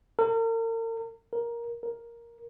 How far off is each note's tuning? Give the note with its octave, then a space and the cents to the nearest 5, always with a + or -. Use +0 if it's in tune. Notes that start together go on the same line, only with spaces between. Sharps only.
A#4 -40
A#4 +10
A#4 +5